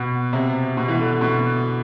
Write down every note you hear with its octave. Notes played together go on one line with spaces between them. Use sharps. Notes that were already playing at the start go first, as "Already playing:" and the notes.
Already playing: B2
C3
B2
E3
D3
B2